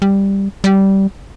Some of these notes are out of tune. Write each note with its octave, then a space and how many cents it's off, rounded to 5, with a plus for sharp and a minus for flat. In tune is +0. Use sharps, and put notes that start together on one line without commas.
G3 +5
G3 -15